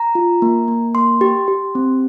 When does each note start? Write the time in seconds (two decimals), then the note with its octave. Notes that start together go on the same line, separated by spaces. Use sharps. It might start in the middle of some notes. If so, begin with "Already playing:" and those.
Already playing: A#5
0.15 F4
0.42 A#3
0.68 A#3
0.95 A#3 C6
1.21 G4
1.48 G4
1.75 C4